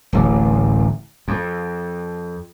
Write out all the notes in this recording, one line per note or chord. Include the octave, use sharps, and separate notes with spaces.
D1 A1
F2